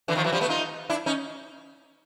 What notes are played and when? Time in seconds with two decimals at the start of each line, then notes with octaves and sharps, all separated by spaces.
0.08 D3 E3
0.15 D#3 F3
0.24 E3 F#3
0.32 F3 G3
0.41 A3 B3
0.49 D#4 F4
0.90 D4 E4
1.06 C#4 D#4